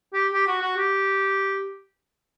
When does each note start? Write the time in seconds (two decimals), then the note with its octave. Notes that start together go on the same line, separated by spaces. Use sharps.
0.13 G4
0.33 G4
0.47 F#4
0.62 F#4
0.77 G4